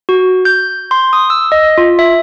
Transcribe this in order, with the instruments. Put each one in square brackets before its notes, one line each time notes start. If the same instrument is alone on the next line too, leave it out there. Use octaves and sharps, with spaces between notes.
[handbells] F#4
G6
C6
D#6
E6
D#5
F4
E5